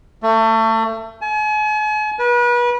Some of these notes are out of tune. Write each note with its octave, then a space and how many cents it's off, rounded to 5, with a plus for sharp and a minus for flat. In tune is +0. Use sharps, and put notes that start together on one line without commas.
A3 +30
G#5 +40
B4 -35